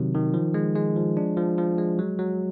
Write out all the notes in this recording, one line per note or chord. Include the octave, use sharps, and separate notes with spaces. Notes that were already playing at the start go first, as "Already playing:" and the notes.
Already playing: C3 D#3 F#3
D#3
F3
G#3
G#3
F3
D4
F3
F3
G#3
F#3
F#3